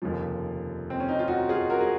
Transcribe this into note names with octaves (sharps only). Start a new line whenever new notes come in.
F1 D#2 C#3 F3
C4
C#4
D#4
F4
D#4 F#4
F4 G#4
F#4 A#4
G#4